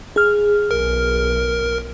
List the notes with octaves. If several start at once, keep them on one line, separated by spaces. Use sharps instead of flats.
G#4 F6
B1 A#4